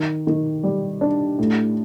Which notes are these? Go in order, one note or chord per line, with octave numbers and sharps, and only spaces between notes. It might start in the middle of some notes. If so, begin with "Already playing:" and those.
Already playing: D#3
D#3
G3
D4
A2